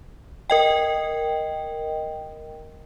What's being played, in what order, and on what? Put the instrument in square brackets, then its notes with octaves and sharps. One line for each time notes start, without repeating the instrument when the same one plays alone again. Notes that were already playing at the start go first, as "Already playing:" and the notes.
[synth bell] A#4 D#5 G5